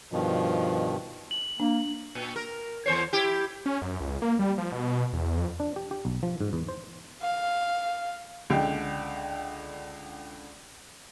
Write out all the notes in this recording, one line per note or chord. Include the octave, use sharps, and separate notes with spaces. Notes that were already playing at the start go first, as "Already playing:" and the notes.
G2 B2 D#3 F3
F#7
A#3 D4
A#2
A#4
E2 C5 C#5
E4 G4
C#4
F#2
C#2
A#3
G3
F3
B2
E2
F2
D4
G4
G4
B1
F3
G#2
E2
C5
F5
C#2 D3 G5